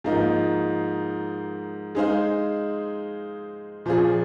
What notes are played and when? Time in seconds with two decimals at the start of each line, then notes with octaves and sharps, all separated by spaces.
0.04 G#2 F3 A#3 D#4
1.95 G#3 D#4 G#4 C5 F5
3.86 A#2 F3 C4 F4 G#4